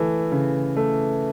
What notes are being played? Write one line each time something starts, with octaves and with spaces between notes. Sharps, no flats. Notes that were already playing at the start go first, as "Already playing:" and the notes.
Already playing: E3 A3
C#3
A3